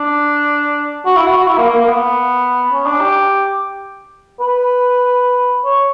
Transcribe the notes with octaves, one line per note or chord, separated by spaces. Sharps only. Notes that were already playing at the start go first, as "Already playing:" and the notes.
Already playing: D4
F#4
E4
F#4
F#4
E4
A#3
A#3
A#3
B3
C#4
D4
G4
B4
C#5